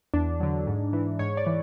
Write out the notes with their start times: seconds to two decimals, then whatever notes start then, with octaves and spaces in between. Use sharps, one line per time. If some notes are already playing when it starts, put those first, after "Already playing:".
0.14 E2 D4
0.40 D3 F#3
0.67 G#2
0.93 E3
1.19 G#2 C#5
1.37 D5
1.46 E3